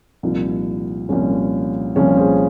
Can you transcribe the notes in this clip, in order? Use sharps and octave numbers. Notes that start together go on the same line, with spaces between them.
C2 A#2 F3 D#4
C2 A#2 F3 C#4 F4
C2 A#2 F3 C#4 F4
G#4 C5